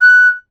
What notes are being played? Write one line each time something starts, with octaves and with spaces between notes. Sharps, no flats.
F#6